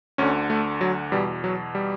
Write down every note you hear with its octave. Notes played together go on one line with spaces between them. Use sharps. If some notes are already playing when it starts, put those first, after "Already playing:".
D2 D3 C#4
A3
F#3
E2 B2 G3
F#3
G3